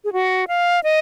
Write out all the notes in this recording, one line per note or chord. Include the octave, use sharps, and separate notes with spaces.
G#4
F#4
F5
D#5